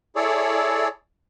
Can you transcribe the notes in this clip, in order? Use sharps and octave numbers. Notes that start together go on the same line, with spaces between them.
E4 G#4 A4 C#5 D5